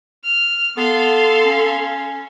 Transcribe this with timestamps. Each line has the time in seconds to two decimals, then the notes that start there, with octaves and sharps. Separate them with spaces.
0.23 F6
0.77 B3 A4 F5 C6
1.45 C#4